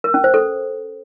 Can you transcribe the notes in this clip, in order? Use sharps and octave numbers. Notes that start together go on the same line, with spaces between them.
A#4
C#4
C5
A4